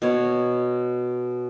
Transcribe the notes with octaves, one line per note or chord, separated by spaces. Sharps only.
B2 C#5